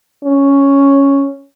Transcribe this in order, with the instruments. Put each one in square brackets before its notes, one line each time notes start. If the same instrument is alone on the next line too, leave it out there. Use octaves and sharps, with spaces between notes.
[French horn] C#4